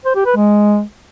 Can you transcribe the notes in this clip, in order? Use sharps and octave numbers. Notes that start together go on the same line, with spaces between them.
C5
G4
B4
G#3